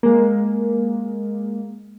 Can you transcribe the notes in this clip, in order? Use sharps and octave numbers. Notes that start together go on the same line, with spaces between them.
G#3 A#3